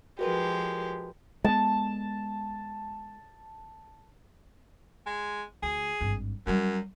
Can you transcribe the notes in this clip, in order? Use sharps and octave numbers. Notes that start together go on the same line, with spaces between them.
F3 G#3 F#4 G4 A#4 B4
G#3 B3 A5
G#3
D2 G#4
G#1 G2
F#2 F#3 G3